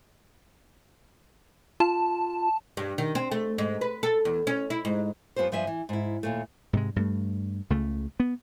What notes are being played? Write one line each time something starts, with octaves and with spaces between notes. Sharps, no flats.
F4 A5
G2
D#3
C4
A3
G#2
B4
A4
E2
C#4
E4
G#2
F#2 B3 F4 G4 C5
G2 F3 D4 D#5 E5 G#5
E3
G#2 E4
D#2 A#2 A3
G#2 C3 G#3
G2 A3
C#2 C#3 A3
B3